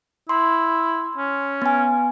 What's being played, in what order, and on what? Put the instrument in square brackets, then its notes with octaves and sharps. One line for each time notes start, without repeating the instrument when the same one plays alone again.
[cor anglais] E4 [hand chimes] C6
[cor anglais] C#4
[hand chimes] B3 G#5